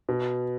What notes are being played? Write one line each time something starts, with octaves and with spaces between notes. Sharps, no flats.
B2